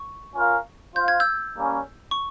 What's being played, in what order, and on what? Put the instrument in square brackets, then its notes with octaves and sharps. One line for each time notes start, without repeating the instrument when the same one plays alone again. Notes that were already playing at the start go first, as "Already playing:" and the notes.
Already playing: [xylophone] C#6
[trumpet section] C#4 F4 A#4 F5
[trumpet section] F4 C5 F5 [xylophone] G6
[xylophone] G#6
E6 G6
[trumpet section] G3 A#3 C#4
[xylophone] C#6